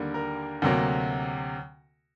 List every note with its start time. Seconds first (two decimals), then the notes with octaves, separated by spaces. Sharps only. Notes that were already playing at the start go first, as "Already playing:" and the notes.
Already playing: D#2 D3 G3 A#3
0.14 A#4
0.62 D2 C3 F#3 A#3